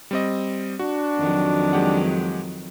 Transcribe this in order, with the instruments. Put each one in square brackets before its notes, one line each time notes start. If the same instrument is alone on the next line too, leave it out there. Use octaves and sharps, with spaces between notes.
[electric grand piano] G3 C4 D#5
[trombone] D4 [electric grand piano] F#4
[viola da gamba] F2 D#3 F#3
[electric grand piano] G#3 G4 F#5